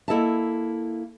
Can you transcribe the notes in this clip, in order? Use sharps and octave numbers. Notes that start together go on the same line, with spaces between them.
A#3 E4 A4 D#5 E5 A5